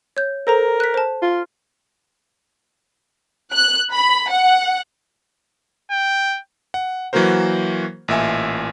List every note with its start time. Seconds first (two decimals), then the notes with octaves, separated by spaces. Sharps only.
0.17 C#5 G6
0.47 A4 A#4 C5 A#5
0.80 F#6 B6
0.94 C5 A5
1.22 F4
3.53 F#6
3.92 B5
4.30 F#5
5.91 G5
6.74 F#5
7.13 E3 F#3 A#3 F#4 A#4 C5
8.08 A1 A#2 E5 G#5